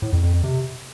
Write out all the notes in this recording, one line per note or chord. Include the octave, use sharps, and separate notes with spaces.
A2
F2
F2
F2
C3